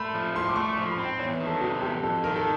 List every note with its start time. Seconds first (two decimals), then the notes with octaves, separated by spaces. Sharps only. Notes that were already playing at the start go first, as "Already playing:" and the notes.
Already playing: A3 B5 C6
0.14 F3
0.35 A2 C6
0.49 D6
0.56 A3 C#6
0.73 C#6
0.77 F3 C6
0.91 B5
0.98 C4
1.05 G5
1.19 E2 C#5
1.33 B4
1.40 D#3
1.47 A4
1.61 C3 F#4
1.82 E2 G4
2.03 F2 A4
2.24 D#3 A#4
2.36 A4